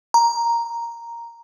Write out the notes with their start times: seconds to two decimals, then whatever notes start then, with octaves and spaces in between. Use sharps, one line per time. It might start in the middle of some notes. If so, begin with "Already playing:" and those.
0.14 A#5